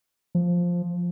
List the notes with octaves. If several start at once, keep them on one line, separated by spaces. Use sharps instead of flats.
F3